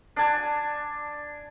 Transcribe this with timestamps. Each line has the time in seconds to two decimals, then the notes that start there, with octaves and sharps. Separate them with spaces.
0.16 D4 G#5